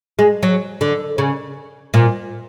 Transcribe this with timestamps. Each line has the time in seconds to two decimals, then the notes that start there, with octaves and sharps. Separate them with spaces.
0.19 G#3
0.43 F#3
0.81 D3
1.18 C#3
1.94 A#2